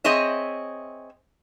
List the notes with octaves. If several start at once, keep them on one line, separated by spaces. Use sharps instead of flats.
C4 G#4 C#5 D#5 E5